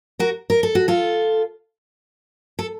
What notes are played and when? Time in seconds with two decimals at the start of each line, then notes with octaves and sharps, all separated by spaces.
0.19 F#4 A#4
0.50 A#4
0.63 A4
0.75 F#4
0.88 F4 A4
2.59 A4